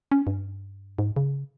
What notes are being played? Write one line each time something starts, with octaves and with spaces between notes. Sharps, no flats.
C#4
G2
G#2
C#3